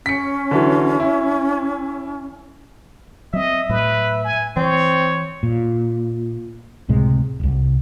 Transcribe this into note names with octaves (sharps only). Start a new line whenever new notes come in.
C#4 B6 C#7
D3 E3 F#3
E4
F#3 C4 D#5 E5
A2 F#3 B4
G#5
E3 C4 C#5
A#2
C#2 A2 C3 G#3
D1 C2